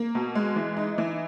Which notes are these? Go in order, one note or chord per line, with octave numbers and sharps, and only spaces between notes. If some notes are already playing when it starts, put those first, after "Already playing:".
Already playing: A#3
B2
G#3
E3
D#4
E3